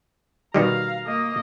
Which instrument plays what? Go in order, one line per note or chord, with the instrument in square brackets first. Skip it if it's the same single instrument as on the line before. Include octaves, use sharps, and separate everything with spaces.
[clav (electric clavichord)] B2 D#3 G3 [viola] F5 A#5
[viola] A#3 D#5